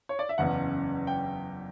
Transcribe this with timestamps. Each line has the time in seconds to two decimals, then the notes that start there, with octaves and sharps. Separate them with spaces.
0.09 C#5
0.19 D5
0.29 E5
0.38 F#1 E2 C#3 F#5
1.07 G5